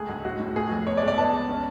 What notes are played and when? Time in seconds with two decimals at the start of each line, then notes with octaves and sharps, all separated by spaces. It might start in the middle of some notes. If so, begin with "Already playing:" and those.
Already playing: C#2 A3 G#4
0.09 D2
0.25 A2 F#4
0.40 A2
0.56 A3 G#4
0.71 F2
0.86 B3 C#5
0.97 D5
1.02 C#2
1.08 D5
1.17 B3 A5
1.33 C#2
1.49 C#4